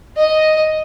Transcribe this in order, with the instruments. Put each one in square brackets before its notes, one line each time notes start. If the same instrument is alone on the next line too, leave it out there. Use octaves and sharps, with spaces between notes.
[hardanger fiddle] D#5